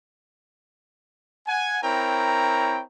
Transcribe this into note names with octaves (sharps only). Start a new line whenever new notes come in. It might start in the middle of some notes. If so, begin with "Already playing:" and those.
F#5 G#5
C4 E4 A#4 C#5 G5 A#5